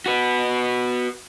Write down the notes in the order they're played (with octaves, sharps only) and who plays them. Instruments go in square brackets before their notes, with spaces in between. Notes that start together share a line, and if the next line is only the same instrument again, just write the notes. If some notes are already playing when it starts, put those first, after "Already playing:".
[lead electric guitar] F#4 B4